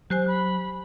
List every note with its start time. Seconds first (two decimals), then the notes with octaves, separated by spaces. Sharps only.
0.10 F#3 G4 C5 G#5 F#6
0.28 B5